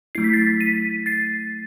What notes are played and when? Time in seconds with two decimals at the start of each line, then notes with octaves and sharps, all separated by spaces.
0.15 F#3 A3 E4 C7
0.24 B6
0.33 A6 C7
0.61 B6 D#7
1.06 A6 C7